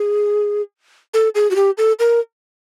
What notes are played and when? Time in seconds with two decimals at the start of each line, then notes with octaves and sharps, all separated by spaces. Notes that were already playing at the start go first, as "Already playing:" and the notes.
Already playing: G#4
1.14 A4
1.35 G#4
1.51 F#4
1.55 G4
1.77 A4
1.99 A#4